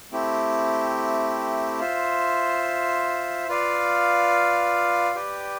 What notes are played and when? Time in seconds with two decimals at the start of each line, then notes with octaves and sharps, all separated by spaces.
0.12 A3 C4 E4 G4
1.80 F4 C5 E5
3.48 F4 B4 D5 F5
5.15 G4 B4 D5 G5